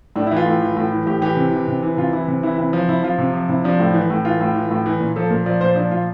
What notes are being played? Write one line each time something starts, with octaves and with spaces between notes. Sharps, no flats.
A2 D4
E4
E3 F4
A2
E3
A2
E3
A2 G4
E3 G4
C3
E3
C3
E3
C3 F4
E3 E4
C3
E3 E4
C3 E4
F3
C3 E4
F3 F4
C3
F3
C3 E4
F3 D4
A2
E3
A2
E3 F4
A2
E3
A2
E3
A#2
F3 A4
A#2 A#4
F3 D5
A#2 C5
F3 D4
A#2 F4